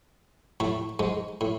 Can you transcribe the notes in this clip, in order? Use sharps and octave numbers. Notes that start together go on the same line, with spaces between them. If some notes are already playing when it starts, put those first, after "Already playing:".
A2 A3
G#2 G#3
A2